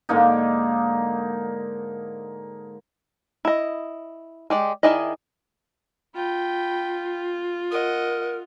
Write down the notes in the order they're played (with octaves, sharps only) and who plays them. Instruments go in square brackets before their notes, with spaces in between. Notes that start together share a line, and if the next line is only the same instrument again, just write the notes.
[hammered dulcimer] G#2 D3 A#3 D#4
[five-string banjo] E4 D#5
G#3 G4 D5
D#3 E4 G#4 D5 D#5
[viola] F4 [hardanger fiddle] G5 B5
[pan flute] A#4 [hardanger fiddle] D#5 F#5